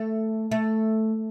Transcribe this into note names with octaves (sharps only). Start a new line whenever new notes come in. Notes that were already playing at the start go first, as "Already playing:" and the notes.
Already playing: A3
A3